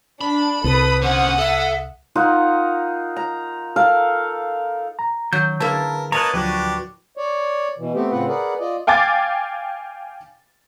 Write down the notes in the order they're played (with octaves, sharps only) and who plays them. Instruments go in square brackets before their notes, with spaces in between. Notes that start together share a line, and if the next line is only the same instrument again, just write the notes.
[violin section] D4 [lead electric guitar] B5
[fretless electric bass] C2 [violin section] A4 D#6 [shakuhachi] B4
[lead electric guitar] D3 C#4 [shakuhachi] C5 [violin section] F#5 D#6
[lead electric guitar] A4 [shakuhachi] E5
[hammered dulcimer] D#4 F4 A#4 F#5
A#5
A4 A#4 F5
[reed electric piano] A#5
[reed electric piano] D#3 [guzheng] F#3 [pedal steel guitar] G6
[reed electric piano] D3 G#4 B4 [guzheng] A#3 E4 [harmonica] A#4 [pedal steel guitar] A5
[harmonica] A#3 D#5 A5 [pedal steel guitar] B4 A#5 [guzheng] C#5
[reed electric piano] D2 F3 F#3 [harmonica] D4 G4 [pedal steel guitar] F#4 B4
[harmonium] C#5 D5
B2 E3
A3 B3 C4 G4
A2 C#3 C4 F4 B4 F#5
G#4 A#4 B4 D5 F#5
F4 D5 D#5
[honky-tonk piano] F5 G5 G#5 D6 A6